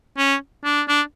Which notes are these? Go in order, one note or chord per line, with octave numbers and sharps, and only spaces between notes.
C#4
D4
D4